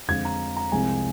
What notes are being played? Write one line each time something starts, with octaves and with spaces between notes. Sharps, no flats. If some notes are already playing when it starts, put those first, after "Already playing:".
F2 D3 F3 G#3 G#6
A#5
A#5
C2 C3 F3 G#3 C4 G#5